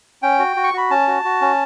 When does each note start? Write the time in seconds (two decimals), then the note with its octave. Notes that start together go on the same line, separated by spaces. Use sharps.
0.22 C#4 G5
0.39 F#4
0.56 F#4
0.64 C#6
0.73 F#4 B5
0.91 C#4 A5
1.08 F#4
1.25 F#4
1.42 C#4